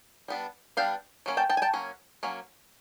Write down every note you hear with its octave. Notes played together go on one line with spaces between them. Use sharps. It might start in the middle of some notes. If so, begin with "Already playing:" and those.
G3 B3 D4
G3 B3 D4 F5 G5
F#3 A#3 C#4
G5 A5
G5 A5
G#5
G5 A5
F#3 A#3 C#4
F#3 A#3 C#4